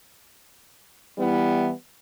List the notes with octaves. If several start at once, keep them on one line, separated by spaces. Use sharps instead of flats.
E3 G3 B3 E4